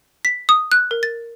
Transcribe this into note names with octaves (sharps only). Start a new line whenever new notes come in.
B6
D#6
F#6
A#4
A6